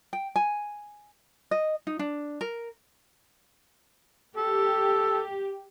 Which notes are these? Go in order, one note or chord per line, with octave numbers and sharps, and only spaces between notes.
G5
G#5
D#5
D#4
D4
A#4
G4 A4